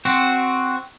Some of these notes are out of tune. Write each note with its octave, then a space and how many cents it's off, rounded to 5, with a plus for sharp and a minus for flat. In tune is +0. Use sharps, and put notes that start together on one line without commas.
C4 +0 F#4 +0